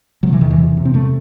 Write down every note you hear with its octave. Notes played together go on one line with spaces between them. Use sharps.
C3 F#3
E3
E2 D#3
E3
C3
C3
C4
C3 A3